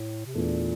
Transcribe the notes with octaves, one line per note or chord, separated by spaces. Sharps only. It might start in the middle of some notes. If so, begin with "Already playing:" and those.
Already playing: A2
C3
E2 A#2 E3 A3 D4